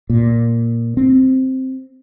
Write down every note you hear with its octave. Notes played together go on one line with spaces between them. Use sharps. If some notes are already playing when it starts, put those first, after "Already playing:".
A#2
C4